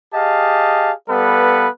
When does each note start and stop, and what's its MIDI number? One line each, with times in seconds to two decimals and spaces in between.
0.14 0.92 67
0.14 0.92 68
0.14 0.92 75
0.14 0.92 77
0.14 0.92 81
1.09 1.68 55
1.09 1.68 59
1.09 1.68 69
1.09 1.68 71
1.09 1.68 77